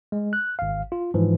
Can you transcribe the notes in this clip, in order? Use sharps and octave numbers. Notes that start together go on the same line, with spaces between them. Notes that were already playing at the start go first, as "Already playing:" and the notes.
G#3
F#6
G#1 F5
F4
G#2 E3 F3